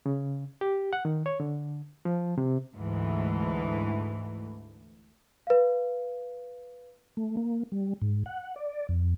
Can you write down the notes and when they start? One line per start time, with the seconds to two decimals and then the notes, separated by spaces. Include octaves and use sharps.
0.06 C#3
0.61 G4
0.93 F#5
1.05 D#3
1.26 C#5
1.40 D3
2.05 F3
2.38 C3
2.74 D2 G#2 E3 A3
5.47 B4 F5
7.17 A3
7.37 A#3
7.72 G3
8.02 G#2
8.26 F#5
8.56 D5
8.89 F2